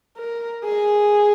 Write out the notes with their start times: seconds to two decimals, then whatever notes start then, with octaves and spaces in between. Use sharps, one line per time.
0.17 A#4
0.64 G#4